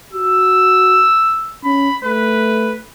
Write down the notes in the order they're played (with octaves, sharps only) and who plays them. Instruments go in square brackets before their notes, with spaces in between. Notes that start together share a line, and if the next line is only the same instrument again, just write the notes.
[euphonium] F#4 [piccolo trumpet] E6
[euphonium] C#4 [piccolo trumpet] B5
[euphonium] A3 [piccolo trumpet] B4